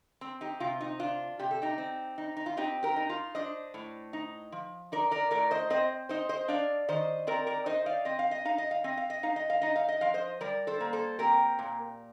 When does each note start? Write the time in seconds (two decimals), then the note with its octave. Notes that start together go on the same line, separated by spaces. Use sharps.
0.21 C4
0.41 D#4 G4
0.60 C3 F4
0.81 D#4
0.99 D4 F4
1.39 C3 G4
1.51 A4
1.62 D#4 G4
1.78 C4
2.18 D#4
2.37 D#4
2.46 F4
2.57 C4 D#4 G4
2.83 G4 A#4
2.96 D#4
3.09 F4
3.35 D4 C5 D#5
3.74 A2
4.13 D#4
4.52 F3
4.92 D#4 A#4 D5
5.11 A#4 D5
5.31 A2 A#4 D5
5.51 C5 D#5
5.70 C4 C5 D#5
6.09 D#4 C5 D#5
6.29 C5 D#5
6.48 D4 D5 F5
6.89 D#3 C5 D#5
7.27 C4 A#4 D5
7.46 A#4 D5
7.66 D#4 C5 D#5
7.86 D5 F5
8.05 C4 D#5
8.19 F5
8.31 D#5
8.45 D#4 F5
8.58 D#5
8.71 F5
8.84 C4 D#5
8.97 F5
9.10 D#5
9.23 D#4 F5
9.36 D#5
9.50 F5
9.61 D#4 D#5
9.76 F5
9.88 D#5
10.01 F3 F5
10.14 C5 D#5
10.41 G3 A#4 D5
10.67 A4 C5
10.80 A#3
10.93 A4 C5
11.19 C4 G4 A#4
11.59 A#2